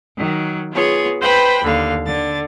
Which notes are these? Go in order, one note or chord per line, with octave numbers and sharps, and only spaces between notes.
D#3 F#3
B3 F4 G#4 C#5
B4 C5 G5 B5
D#2 D3 F5
D3 A6